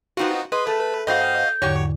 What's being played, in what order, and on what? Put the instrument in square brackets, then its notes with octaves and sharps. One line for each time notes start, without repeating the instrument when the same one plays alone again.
[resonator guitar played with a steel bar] B3 C4 F4 [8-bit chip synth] D#4 F#4
[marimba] G#4 [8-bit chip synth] B4 [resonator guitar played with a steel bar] D#5 [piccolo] C6
[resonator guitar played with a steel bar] A3 [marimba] A4 [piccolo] A5
[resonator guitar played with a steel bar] G2 C4 F#4 [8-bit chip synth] D#5 F5 [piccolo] G6
[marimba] E2 G#2 D3 [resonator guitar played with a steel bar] F#3 F#4 G4 [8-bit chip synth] C#5